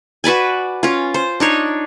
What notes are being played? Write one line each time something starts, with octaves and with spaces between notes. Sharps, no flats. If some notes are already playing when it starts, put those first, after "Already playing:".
F#4 B4 D5 G#5
C#4 F4
C5
D4 D#4 C#5